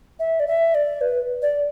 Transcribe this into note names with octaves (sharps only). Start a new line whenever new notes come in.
E5
D5
E5
D5
B4
D5